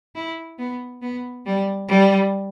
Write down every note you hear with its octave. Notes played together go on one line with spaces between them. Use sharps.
E4
B3
B3
G3
G3